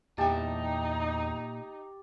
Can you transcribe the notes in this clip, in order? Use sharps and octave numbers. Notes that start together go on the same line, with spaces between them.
E2 A#2 D#4 G4 E5 A5